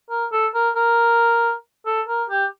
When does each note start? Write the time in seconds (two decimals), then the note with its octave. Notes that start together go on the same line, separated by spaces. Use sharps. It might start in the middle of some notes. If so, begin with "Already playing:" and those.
0.10 A#4
0.32 A4
0.54 A#4
0.75 A#4
1.86 A4
2.08 A#4
2.30 G4